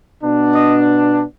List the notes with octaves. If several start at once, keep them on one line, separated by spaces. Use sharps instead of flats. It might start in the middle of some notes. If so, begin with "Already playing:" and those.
B2 B3 D4
D#5